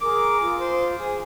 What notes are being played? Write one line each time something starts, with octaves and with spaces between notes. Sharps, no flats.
G#4 A#4 D6
F4
C5
G#4